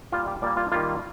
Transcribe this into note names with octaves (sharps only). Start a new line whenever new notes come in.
A#2 G3 A#3 F4
G4
A#2 G3 A#3 D5
F4
D#3 G3 A#3 F4